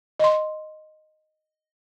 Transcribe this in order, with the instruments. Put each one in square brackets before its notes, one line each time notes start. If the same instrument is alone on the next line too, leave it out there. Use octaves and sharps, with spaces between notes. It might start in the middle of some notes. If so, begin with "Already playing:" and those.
[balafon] D#5 C6